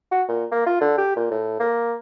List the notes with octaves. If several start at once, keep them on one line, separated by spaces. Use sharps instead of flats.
F#4
A#2
A#3
F4
D3
G4
A#2
A2
A#3